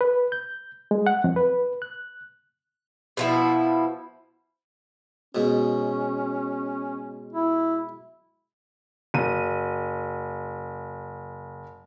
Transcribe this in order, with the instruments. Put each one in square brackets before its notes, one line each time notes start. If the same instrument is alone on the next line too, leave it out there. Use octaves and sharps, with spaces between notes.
[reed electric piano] B4
G6
G#3
F#5
F2
B4
F#6
[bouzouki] B2 F3 E4
[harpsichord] G#2 B2 [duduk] C#4
[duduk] E4
[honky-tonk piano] F#1 D#7